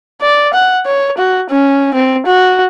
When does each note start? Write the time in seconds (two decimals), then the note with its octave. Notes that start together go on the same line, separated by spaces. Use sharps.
0.21 D5
0.54 F#5
0.86 C#5
1.18 F#4
1.50 C#4
1.94 C4
2.26 F#4